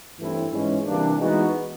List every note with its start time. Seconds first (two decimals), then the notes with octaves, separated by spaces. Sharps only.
0.18 G2 E3 A3 C4 E4
0.51 G#2 E3 G#3 C#4
0.85 C3 E3 G3 A#3 D4
1.19 E3 G#3 B3 D#4 F#4